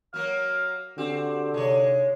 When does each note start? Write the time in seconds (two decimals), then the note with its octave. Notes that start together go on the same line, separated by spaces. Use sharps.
0.14 F#3 A#3 F6
0.98 D3 C4 F#4 G4
1.54 G#2 C3 G#3 C#5